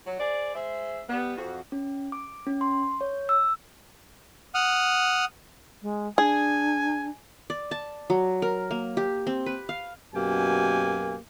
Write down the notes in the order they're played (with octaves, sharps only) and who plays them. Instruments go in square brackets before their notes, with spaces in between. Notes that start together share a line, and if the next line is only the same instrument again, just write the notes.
[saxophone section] F#3
G#4 C5 D5
G#3 C5 E5
G3 B3
F2 F#4
[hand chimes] C#4
D6
C#4
C6
C#5
E6
[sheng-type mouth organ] F#5 D#6 F6
[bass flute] G#3
[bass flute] D4 [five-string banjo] G#4 [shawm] G#5
[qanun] D5
A5
F#3
A#4
A#3
G4
C4
B4
F5
[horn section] F#2 B2 A#3 G4 G#5